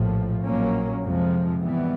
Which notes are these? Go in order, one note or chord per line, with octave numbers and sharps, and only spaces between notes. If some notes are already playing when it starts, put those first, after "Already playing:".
Already playing: A#1 A2 F3
A#1 A#2 F#3 A#3 C#4
F2 C3 F3 G#3
G#2 E3 G3 B3